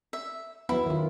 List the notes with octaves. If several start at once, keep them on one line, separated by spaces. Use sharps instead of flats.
E5
F#3 B3 E4
D#3 F4